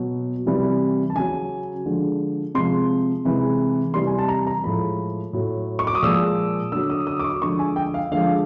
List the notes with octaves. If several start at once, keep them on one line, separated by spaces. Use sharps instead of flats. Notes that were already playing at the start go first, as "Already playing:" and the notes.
Already playing: B2 F#3
C3 E3 G3
A5
C#3 F#3 G#5
D3 F3 G#3
C3 F3 G#3 C6
C3 E3 G#3
C3 E3 G3 C6
G#5
A5
A#5
A#5
A2 F3 G#3 B5
A2 F#3
C#6
D6
D#6
A#2 F3 G#3 E6
D3 F#3 E6
D#6
D#6
D6
C#6
D3 F3 G#3 C#6
G#5
G5
F5
D3 F3 G#3 F5